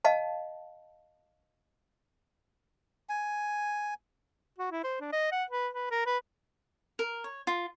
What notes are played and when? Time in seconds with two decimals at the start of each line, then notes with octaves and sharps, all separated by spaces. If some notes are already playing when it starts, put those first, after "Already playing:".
0.05 D#5 F5 A5
3.09 G#5
4.58 F#4
4.72 E4
4.84 C5
5.01 D4
5.13 D#5
5.32 F#5
5.50 B4
5.74 B4
5.91 A#4
6.07 B4
6.99 A#4
7.24 C#5
7.47 F4